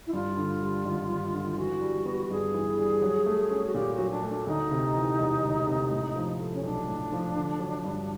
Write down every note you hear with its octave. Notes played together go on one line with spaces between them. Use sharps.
E4
G2 F4
D3
G3
G#1
G2
D3
F4
E3 F#4
G3
B3
G2 G#4
E3
G3
F#3
A3
C#4
F#4
A#2 G4
F#4
F#3
D4
A3
D4
D2 D#4
C3
E3
E1
D2
C3
A2
F3
A3
C#4
B1 D4
A2
F3
D3
F#3
G2